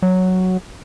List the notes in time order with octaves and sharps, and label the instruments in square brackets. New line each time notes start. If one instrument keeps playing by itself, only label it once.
[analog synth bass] F#3